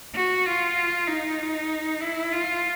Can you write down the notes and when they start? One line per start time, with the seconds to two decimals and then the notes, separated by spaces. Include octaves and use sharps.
0.14 F#4
0.46 F4
1.08 D#4
2.01 E4
2.32 F4